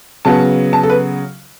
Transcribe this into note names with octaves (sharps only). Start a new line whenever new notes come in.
C#3 F#3 B3 A5
A5
A4
B4